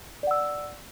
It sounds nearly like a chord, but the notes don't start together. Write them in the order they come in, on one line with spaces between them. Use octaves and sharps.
D5 F#5 E6